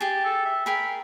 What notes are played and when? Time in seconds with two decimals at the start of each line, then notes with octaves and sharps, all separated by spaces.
0.01 G4 G#4 A5
0.25 A4
0.45 E5
0.66 G#4 A#4 G5 B5